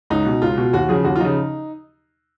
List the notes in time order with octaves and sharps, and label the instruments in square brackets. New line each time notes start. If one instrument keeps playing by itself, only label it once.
[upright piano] C#2 D#4
B2
C#2 F4
B2
D#2 F#4
C#3 F3 G#4
D#2 F#4
F4
C#3 F3 D#4